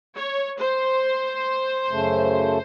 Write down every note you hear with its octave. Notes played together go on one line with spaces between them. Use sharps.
C#5
C5
F#2 C#3 A3